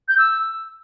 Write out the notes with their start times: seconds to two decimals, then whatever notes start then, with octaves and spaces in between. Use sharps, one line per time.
0.08 G6
0.18 E6